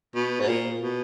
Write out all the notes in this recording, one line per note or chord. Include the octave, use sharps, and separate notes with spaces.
B2
G#2
A#2
B2